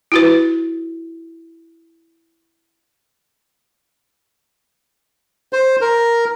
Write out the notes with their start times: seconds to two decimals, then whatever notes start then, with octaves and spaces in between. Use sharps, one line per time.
0.12 E4 F#4 B4
5.53 C5
5.81 A#4